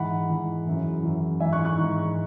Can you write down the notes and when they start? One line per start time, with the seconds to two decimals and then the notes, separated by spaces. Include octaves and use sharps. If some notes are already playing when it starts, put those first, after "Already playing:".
Already playing: G#2 E3 F#5 B5
0.29 G#2 E3
0.67 F#2 C#3 E3
1.03 F#2 C#3 E3
1.40 G#2 E3 E5 G#5
1.52 C#6 F#6
1.65 C#6 F#6
1.77 G#2 E3